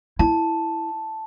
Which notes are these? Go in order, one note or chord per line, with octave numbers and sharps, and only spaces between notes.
E4 A5